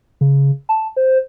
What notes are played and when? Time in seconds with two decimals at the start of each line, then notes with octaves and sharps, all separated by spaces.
0.21 C#3
0.69 A5
0.97 C5